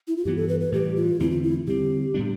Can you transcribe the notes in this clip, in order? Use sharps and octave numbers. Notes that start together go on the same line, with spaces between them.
E4
F4
G2 E3 B3 G4
A4
B4
B4
A2 E3 G3 G4
F4
E2 D3 A3 C4 E4
F4
E4
D3 G3 C4 G4
A2 G3 B3 D4